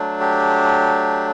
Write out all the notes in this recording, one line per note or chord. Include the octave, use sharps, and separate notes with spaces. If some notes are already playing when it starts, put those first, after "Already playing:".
Already playing: F#3 A3 D4
G4